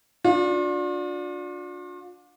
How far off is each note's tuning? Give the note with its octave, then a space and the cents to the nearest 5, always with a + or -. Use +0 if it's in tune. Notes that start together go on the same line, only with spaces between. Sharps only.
D4 +0 F4 +45